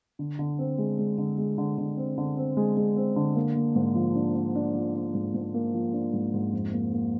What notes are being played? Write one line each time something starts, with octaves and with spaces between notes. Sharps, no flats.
D3
D3
C4
G#3
G#3
D3
G#3
D3
D3
C4
D3
C4
G#3
G#3
C4
D3
A#3
A#3
G#2
F3
D4
D4
D4
F3
D4
G#2
G#2
A#3
F3
D4
G#2
G#2
F2
A#3
A#3